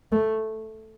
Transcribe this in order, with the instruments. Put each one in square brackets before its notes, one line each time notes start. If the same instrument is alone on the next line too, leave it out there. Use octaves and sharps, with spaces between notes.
[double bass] A3